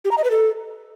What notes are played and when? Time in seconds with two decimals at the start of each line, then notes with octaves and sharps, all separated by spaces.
0.05 G4
0.11 A#5
0.18 D#5
0.24 B4
0.31 A4